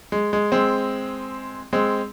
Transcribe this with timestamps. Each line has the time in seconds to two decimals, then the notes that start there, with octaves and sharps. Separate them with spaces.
0.12 G#3
0.33 G#3
0.52 G#3 C4
1.73 G#3 C4